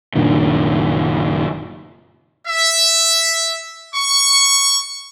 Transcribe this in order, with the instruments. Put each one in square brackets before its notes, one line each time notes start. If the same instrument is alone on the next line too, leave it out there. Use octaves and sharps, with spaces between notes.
[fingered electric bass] F#1 A#2 D#3 D4
[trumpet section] E5
C#6